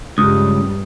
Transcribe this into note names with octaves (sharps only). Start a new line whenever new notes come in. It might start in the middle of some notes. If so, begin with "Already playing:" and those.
C#2 G2 G3 D#6